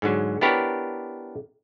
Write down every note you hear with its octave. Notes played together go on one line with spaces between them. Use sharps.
G#2 D3 F#3
B3 D4 E4 G4 A#4 C#5